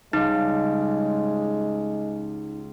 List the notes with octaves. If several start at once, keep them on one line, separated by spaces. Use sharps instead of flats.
C#2 G3 G#3 D#4